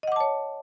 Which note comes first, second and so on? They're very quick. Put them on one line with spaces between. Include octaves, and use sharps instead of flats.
D#5 F#5 D6 A5 C#5